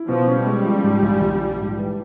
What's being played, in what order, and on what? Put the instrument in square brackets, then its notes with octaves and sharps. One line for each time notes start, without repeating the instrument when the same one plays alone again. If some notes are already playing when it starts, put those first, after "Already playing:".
Already playing: [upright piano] E4
[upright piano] B2 [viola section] F3
[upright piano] C#4
[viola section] G3
[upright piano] G#3
F3
G#2
A#1
A#1
F3
G#2
E3